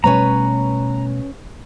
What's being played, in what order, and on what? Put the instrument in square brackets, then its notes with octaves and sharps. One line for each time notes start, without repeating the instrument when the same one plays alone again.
[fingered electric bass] B2 G3 A3 [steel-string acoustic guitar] C#4 B4 C#5 [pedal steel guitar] A#5